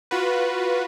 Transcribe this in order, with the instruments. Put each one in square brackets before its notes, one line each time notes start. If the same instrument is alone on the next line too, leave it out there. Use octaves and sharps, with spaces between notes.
[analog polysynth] F4 F#4 B4